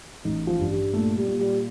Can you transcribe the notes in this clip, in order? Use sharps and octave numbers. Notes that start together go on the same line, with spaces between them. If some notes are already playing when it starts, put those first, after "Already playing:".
A1 D#4
F3
G2
G3
A#2 A3
G3
A#2
G3